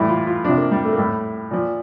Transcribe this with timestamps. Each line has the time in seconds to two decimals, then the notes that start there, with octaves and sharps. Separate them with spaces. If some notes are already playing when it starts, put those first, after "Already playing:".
Already playing: A2 E3 G3 E4
0.09 F4
0.27 F4
0.44 C3 F3 D4
0.58 A#3
0.71 G3
0.84 A3
0.93 A#3
0.98 A2 G3 A3
1.51 A#2 F3